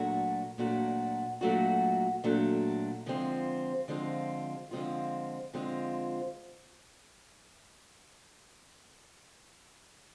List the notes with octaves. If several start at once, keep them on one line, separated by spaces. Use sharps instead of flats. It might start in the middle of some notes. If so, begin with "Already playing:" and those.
Already playing: A#2 F#3 A3 D4 F#4
A#2 F#3 A3 D4 F#4
A#2 F#3 A3 D4 F#4
A#2 F#3 A3 D4 F#4
D3 F3 G#3 C4 F4
D3 F3 G#3 C4 F4
D3 F3 G#3 C4 F4
D3 F3 G#3 C4 F4